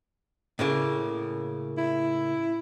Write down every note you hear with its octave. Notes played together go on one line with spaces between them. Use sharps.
A2 C#3 A#3
E4